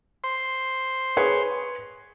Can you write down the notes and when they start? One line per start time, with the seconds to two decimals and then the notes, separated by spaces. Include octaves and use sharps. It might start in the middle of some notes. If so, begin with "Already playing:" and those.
0.24 C5 C6
1.17 G#4 B4 C#5